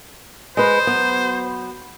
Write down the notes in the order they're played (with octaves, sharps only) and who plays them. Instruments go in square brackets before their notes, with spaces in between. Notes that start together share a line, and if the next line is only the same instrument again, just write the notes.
[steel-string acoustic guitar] G#3 B4 [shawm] C5
[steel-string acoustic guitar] F#3 B3